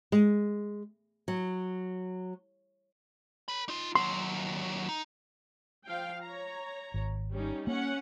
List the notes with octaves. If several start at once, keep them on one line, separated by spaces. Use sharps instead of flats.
G#3
F#3
A#4 B5
D#4 F4
D#2 F#3 C6
D#4
F3 F5 G5
C#5 A#5
G#1
G3 C#4 D#4
A#3 C#4 F#5